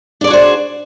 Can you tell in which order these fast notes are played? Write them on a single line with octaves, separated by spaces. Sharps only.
D4 D5 G#4 F#4 C5